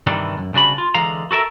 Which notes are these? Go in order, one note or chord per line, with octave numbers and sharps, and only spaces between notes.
G2 C3 D#3 E3 G3 D4
F#2
C2 C#3 D4 F#4 B5
F4
D3 E3 G#3 F5 A#5
F#4 A4 A#4 E5